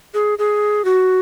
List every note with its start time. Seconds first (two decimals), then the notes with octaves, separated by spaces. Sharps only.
0.14 G#4
0.39 G#4
0.85 F#4